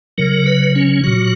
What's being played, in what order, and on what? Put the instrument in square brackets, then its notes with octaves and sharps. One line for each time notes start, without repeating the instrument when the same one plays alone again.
[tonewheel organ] C#3 F#3 A#4
B4
C#4
A#2 F#3 F#4